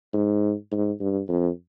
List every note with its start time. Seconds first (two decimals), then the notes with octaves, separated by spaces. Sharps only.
0.14 G#2
0.72 G#2
1.00 G2
1.28 F2